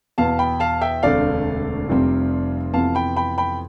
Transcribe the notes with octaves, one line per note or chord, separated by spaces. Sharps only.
E2 B2 B3 F5 A5
G5 B5
F5 A5
E5 G5
E1 D2 D3 A3 C4 D5 F5
F1 F2 C3 G3 C4
F2 C3 E3 B3 F5 A5
G5 B5
G5 B5
G5 B5